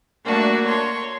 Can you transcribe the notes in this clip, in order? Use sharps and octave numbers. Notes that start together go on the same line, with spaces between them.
G3 A3 A#3 D4 F#4
C#5 C6